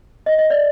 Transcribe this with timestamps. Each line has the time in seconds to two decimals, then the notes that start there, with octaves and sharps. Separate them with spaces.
0.26 D#5
0.38 D#5
0.50 D5